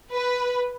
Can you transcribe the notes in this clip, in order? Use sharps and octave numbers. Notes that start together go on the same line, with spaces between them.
B4